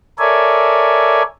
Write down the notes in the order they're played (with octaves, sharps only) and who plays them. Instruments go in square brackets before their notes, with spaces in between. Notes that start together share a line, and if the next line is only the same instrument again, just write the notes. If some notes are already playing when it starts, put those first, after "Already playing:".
[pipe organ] A4 A#4 C#5 D5 E5 G#5